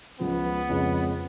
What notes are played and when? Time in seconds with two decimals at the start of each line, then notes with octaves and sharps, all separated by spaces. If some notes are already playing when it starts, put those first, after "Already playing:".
0.20 C#2 C#3 F3 B3
0.69 F2 C#3 F3 G#3 C#4